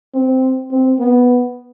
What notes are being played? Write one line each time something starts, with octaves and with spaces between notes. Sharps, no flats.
C4
C4
B3